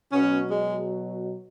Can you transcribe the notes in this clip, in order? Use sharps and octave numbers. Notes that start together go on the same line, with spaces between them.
B2 F#3 B3 C#4
G#3